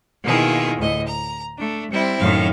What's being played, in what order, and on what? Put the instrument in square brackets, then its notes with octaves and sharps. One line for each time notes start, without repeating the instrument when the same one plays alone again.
[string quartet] B2 D#3 A#3 E4 F4 G#4
D2 A2 D#5
A#5
A3 D4
G3 C4 E4
F#2 A2 D#3 F5